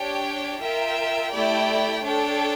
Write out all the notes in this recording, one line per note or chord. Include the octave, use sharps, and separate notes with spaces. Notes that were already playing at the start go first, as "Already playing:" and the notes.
Already playing: D4 G4 C#5 G5
F4 A#4 E5 G5
A3 E4 G4 D5 G5
D4 A4 C#5 G5